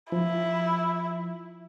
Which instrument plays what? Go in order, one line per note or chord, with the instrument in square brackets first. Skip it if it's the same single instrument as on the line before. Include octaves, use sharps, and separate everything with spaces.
[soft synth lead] F3 [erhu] E4